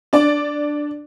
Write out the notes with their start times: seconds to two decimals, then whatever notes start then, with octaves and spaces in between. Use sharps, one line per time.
0.13 D4 D5